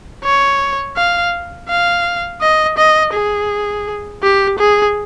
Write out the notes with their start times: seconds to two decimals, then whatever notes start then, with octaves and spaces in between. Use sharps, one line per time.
0.24 C#5
0.97 F5
1.69 F5
2.41 D#5
2.78 D#5
3.14 G#4
4.23 G4
4.59 G#4